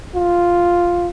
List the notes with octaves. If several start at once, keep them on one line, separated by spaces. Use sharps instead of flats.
F4